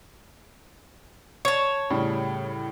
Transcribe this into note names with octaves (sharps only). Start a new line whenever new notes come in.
C#5 A5
A2 C#3 G3